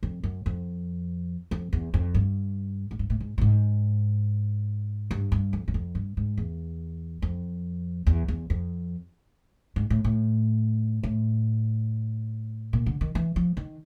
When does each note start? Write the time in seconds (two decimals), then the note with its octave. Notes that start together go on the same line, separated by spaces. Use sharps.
0.03 F2
0.23 F#2
0.46 F2
1.51 F2
1.73 E2
1.94 F2
2.14 G2
2.91 G#2
2.99 G2
3.10 A2
3.20 G#2
3.38 A2
3.41 G#2
5.11 G2
5.32 G2
5.53 F2
5.68 F#2
5.74 F2
5.95 G2
6.17 G#2
6.37 E2
7.22 F2
8.07 E2
8.28 E2
8.50 F2
9.76 G#2
9.90 A2
10.04 A2
11.03 A2
12.73 A#2
12.86 D3
13.01 D#3
13.15 E3
13.36 F3
13.57 D#3